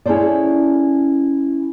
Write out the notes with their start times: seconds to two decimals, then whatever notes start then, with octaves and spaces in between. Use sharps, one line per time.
0.06 C#4 E4 G#4 A4 C5 D5